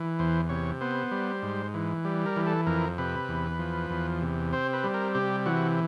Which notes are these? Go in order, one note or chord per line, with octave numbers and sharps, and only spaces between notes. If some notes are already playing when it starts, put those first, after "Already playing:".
Already playing: E3
E2 C5
C3 C#5
B3 C5
G3
G#2
E3
G3
A#4
E3
A4
F2 A#4
C3 B4
E2
F3
E2
C3
C4 C5
B4
G3
A#4
C3 G4
E3 F#4